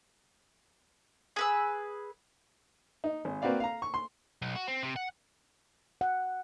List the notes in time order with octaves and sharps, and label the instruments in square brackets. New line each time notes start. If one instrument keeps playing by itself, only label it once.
[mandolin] G#4 B4 E6
[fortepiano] D#4
G#1
A#3 C4 F#4 B4 D5 F5
F5 A#5
C#6
C6
[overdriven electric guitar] B1
F#4
C4
C3
F#5
[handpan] F#5